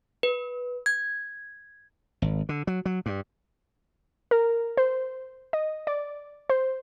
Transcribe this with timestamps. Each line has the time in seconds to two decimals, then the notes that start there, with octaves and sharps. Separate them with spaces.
0.23 B4
0.86 G#6
2.22 G#1
2.49 D3
2.67 F#3
2.85 F#3
3.06 G2
4.31 A#4
4.77 C5
5.53 D#5
5.87 D5
6.50 C5